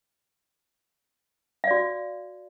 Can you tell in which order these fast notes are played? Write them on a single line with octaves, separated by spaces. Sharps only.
F5 D5 F#4